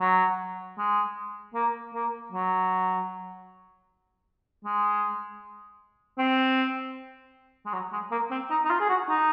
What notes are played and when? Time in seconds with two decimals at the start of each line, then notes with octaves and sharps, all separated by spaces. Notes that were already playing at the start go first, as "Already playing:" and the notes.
0.01 F#3
0.78 G#3
1.54 A#3
1.94 A#3
2.32 F#3
4.65 G#3
6.18 C4
7.65 G#3
7.73 F#3
7.92 G#3
8.11 A#3
8.31 C4
8.50 D#4
8.65 D#4
8.70 F4
8.80 G#4
8.89 F#4
9.09 D#4